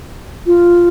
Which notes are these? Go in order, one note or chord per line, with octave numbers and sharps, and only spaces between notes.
F4